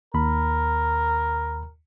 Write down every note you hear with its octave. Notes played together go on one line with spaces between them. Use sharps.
D#2 A#4 B5